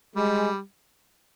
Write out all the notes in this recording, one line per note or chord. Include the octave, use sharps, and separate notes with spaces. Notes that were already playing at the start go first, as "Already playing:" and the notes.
G3 G#3